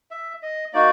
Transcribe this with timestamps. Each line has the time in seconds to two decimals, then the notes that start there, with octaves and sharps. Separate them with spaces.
0.11 E5
0.43 D#5
0.73 A#3 D#4 F#4 D5